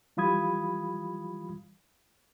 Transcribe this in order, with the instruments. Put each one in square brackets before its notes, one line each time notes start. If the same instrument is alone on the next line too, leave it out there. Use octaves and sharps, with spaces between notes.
[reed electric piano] E3 G3 F4 B5 D#6 G#6